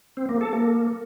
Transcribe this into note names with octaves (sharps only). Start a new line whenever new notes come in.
C4
A#3
A4
A#3